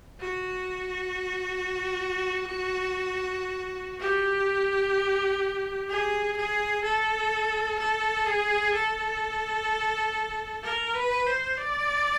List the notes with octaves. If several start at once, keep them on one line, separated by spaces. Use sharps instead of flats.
F#4
G4
G#4
G#4
A4
A4
G#4
A4
A#4
B4
C5
D5